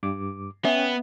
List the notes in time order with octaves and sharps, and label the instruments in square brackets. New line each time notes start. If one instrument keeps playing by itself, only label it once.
[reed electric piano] G2 D6
[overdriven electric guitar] B3 [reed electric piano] C#4 G5 [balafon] E5